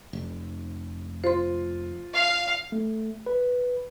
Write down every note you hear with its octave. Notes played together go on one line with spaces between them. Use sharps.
F1
F4 C5 C6
F5
A3
B4